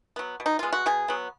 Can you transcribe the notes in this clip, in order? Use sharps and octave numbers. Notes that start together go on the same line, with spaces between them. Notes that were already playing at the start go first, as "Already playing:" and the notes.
F#3 B3
B2
D#4
G#3 B3 F4
F#4
B2 G#4
F#3 B3